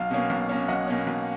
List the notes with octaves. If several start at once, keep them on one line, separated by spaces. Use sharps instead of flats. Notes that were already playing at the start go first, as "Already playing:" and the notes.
Already playing: B1 F5
B2 A#3 C#4
B1
B2 A#3 C#4
B1 D#5 F#5
B2 A#3 C#4
B1